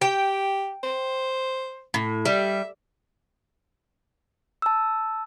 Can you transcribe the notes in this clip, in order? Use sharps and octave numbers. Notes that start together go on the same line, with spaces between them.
G4 G5
C5
A2
G3 E5
A5 E6